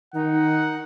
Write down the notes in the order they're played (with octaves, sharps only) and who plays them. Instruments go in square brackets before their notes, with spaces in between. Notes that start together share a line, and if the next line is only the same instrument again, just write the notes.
[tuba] D#3 [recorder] D#4 [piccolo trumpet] F#5